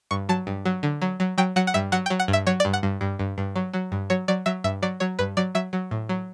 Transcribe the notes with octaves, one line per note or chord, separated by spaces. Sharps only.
G2 C#6
F#3 A5
G2
F#3
D3
F#3
F#3
F#3 G5
F#3 F#5
F#5
G2 E5
F#3 F#5
G5
F#3
F#5
G2
E5
F#3 C#5
D5
G2
F#5
G2
G2
G2
G2
F#3
F#3
G2
F#3 C#5
F#3 D5
F#3 E5
G2 E5
F#3 D5
F#3 C#5
G2 B4
F#3 D5
F#3 E5
F#3
A2
F#3